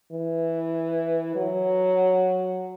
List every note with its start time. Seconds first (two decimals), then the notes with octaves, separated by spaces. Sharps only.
0.12 E3
1.36 F#3